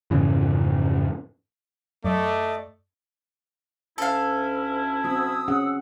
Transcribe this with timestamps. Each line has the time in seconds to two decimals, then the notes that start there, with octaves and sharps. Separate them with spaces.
0.11 F2 G#2 C#3 E3
2.05 F#2 A3 D5 D#5 D6
3.98 D2 C#4 E4 A4 F5
5.04 C4 F#4 D#6 E6
5.48 C#4 G#4 F#5